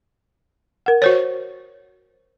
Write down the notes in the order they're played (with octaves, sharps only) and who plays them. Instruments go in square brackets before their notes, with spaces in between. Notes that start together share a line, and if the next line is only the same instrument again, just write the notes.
[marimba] A#4 F#5
[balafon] F#4 C5 C#5